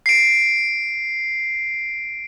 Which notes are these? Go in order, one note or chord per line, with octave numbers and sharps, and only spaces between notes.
C7 D7